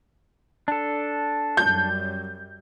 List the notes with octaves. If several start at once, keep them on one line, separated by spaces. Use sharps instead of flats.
D4 A4
F#2 F#3 G3 G6